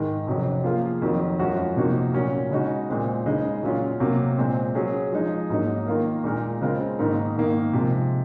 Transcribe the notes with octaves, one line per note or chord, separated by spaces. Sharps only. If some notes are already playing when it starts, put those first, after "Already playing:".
Already playing: G#2 D#3 G#3
F2 C3 F#3 C#4
F3 A#3 F4 G#4
F2 D#3 F#3
F#2 F3 G#3 C#4 F#4
C3 F3 A#3 D#4 F#4
A#2 F#3 C#4 F#4 A#4
C#3 G#3 D#4 F#4
A#2 G#3 C4
C#3 G#3 D#4 G#4
A#2 F#3 C#4 F4
C3 F#3 A#3
A#2 G#3 C4
F#3 C#4 G#4
F3 G#3 D#4 G#4
G#2 F#3 A#3 D#4
D#3 A#3 F4 A#4
A#2 G#3 D#4 A#4
C#3 G#3 C4 F4 A#4
G#2 D#3 A#3 D#4 A#4
G#2 D#3 A#3
C3 F3 G#3